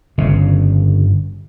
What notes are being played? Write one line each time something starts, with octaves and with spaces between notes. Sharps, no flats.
G1 C#3